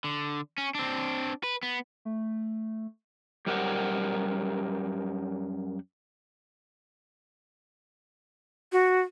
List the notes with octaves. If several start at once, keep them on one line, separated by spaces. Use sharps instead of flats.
D3
C#4
C4 D4
B4
B3
A3
F#2 G3 G4 A#4 C5 F#5
F#4